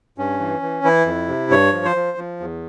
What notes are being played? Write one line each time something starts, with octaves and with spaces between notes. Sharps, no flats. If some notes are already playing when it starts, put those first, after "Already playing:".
G2 C#4
E3
E3
E3 E4
F2
C3
G2 C#5
F3
C5
F3
F3
E2